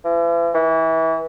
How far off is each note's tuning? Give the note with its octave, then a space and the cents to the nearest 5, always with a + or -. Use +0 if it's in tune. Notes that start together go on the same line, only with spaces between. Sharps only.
E3 +45
E3 -25